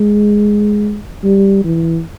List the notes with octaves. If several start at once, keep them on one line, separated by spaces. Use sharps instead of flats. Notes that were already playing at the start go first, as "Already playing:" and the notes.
Already playing: G#3
G3
E3